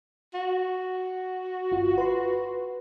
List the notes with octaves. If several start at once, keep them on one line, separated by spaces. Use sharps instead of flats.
F#4
G1 F4
B4 C6